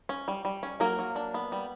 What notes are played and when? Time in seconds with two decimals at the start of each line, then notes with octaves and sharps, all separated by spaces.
0.09 C#4
0.28 G3
0.45 G3
0.63 C#4
0.80 F#3 A#3 A#4
0.99 F#3
1.16 D4
1.34 B3
1.52 G3